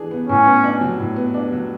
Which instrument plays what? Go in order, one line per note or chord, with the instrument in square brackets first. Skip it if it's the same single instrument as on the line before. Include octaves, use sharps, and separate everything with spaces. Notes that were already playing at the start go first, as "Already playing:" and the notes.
Already playing: [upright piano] E3 D4 G#4
B3
[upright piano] A2 [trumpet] C#4
[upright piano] B3
D4
F#3
A2
B3
D4
F#3